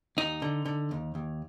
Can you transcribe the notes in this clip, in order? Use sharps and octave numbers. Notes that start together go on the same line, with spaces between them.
D#2 D#4
D3
D3
D#2
D#2